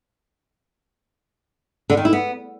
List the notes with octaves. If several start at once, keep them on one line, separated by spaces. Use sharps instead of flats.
D3
D#3
E4
B3